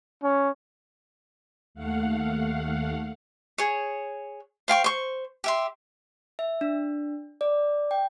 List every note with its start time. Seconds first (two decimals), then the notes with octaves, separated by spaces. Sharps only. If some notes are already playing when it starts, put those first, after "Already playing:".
0.23 C#4
1.75 D#2 A3 F5 F#5
3.58 G#4 C#5
4.68 C5 F5 G5 C#6
4.84 C5 C#6
5.44 G4 E5 C6
6.39 E5
6.61 D4
7.41 D5
7.91 G5